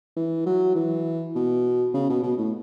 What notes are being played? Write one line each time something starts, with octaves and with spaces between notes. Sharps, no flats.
E3
F#3
E3
B2
C#3
B2
B2
A2